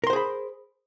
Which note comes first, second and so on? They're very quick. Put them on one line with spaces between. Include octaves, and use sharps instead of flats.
A#4 C6 C5 G#4 B5